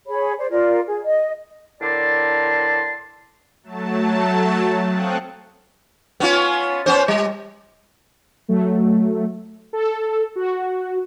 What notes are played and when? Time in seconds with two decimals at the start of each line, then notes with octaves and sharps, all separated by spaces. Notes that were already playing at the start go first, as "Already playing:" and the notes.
0.07 G#4 C#5 B5
0.38 C5 D5
0.50 F4 A#4 D5
0.86 G#4
1.04 D#5
1.81 A2 D3 A#4 D5 A5 C6
3.63 F#3 A3 A5
4.87 C4 F5 G5 C#6 D#6 F#6
6.20 B3 C#4 F4
6.86 B3 C#4 C5
7.08 G3
8.49 F#3 A3
9.73 A4
10.36 F#4